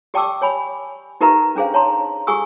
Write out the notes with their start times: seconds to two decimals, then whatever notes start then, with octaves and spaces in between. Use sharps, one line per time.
0.14 G4 D5 G5 A5 D6 E6
0.42 C#5 G#5 B5
1.21 D#4 G4 A#4 B4 E5 A#5
1.55 C#4 D4 G#4 C5 F5
1.74 C#5 A5 A#5 C6
2.27 G4 G#4 G#5 C#6 D#6 E6